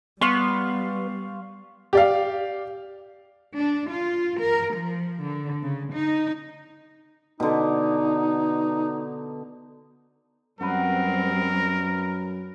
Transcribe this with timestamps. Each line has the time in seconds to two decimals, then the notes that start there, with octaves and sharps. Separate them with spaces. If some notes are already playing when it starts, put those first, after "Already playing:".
0.21 G3 B3 F5 C6 C#6
1.93 G4 D5 F5
3.56 D4
3.90 F4
4.40 A#4
4.74 F3
5.24 D3
5.63 C#3
5.93 D#4
7.40 B2 D3 D#4
10.61 F#2 F#3 G3 C4 A#4 B4